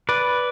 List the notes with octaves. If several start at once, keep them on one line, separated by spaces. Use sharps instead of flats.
B4 D5